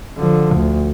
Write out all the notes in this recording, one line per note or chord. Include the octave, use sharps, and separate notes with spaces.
D3 F3
D2